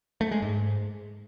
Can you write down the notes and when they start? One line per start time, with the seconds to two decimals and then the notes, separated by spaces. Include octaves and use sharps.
0.21 A3
0.31 G#3
0.42 G#2